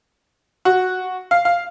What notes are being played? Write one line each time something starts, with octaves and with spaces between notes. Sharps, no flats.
F#4
F5
F5